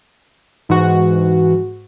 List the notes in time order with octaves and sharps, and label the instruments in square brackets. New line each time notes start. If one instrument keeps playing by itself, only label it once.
[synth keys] G#2 F#4 [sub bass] E3